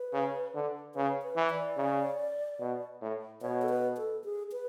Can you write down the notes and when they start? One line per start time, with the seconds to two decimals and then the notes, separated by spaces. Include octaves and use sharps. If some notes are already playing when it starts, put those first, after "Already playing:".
Already playing: B4
0.13 C#3
0.55 D3
0.95 C#3 B4
1.22 B4
1.36 E3
1.50 D5
1.77 C#3
2.60 B2
3.02 A2
3.42 B2 C#5
3.62 A4
3.69 B4
3.97 A4
4.24 G#4
4.52 B4